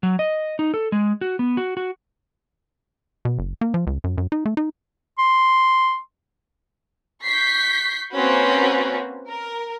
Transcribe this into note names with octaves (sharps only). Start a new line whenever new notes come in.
F#3
D#5
D#4
A4
G#3
F#4
B3
F#4
F#4
B2
F#1
A#3
F3
C#2
F#2
F#2
D#4
A3
D#4
C6
C#6 G6 B6 C7
A#3 C4 C#4 F#4 B4
A#4